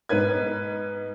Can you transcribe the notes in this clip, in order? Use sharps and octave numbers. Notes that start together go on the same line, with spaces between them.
G#2 B3 B4 G#6